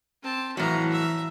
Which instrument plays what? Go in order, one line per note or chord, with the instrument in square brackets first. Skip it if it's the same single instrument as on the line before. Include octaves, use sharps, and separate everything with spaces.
[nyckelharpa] C4 A5
[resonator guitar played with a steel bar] A2 F#3 [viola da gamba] E3 [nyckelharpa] F5 A#5
[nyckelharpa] E5 A#5